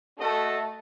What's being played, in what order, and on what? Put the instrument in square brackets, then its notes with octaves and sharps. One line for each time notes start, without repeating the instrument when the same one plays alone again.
[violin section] A3 [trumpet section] F#4 A4 D#5